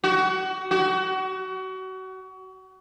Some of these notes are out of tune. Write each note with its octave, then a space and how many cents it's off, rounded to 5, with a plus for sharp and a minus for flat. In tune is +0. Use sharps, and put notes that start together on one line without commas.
F#4 +25
F#4 +30